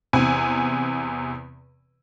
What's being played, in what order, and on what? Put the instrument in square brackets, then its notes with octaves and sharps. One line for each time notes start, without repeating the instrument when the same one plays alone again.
[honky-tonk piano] E2 C3 G#5